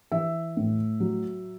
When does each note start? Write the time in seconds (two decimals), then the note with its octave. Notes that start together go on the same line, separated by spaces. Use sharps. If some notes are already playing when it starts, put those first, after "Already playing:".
0.12 E3 E5
0.57 A2
1.00 F#3